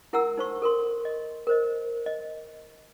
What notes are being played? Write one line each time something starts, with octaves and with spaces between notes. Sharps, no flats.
E4 A#4 F#5 G#5 A#5 E6
D#4 C5 C#6
A4 A#4 C6
D#5
A#4 C5 D#5
D#5